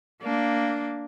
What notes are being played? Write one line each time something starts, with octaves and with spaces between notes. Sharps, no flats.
A#3 D4